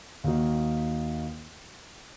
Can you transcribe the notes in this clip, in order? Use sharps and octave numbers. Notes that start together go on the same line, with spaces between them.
D#2 D#3 A#3 D#4 F#4